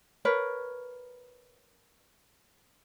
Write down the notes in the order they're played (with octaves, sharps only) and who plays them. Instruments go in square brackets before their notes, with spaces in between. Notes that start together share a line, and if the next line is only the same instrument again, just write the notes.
[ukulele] A#4 B4 C#5